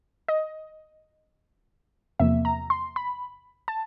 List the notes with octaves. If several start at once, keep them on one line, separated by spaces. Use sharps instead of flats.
D#5
E2 C3 F3 A#3 E5
A#5
C6
B5
A5